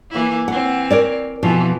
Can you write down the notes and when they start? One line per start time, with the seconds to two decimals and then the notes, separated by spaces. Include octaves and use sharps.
0.11 E3 A#3 E4
0.48 E3 C4 F#5
0.91 A#4 C#5 D5
1.43 F2 B2 E3 F3